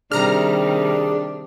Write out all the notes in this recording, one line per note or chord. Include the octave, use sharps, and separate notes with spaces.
C3 D#3 G3 D4 G#4 A#5 F6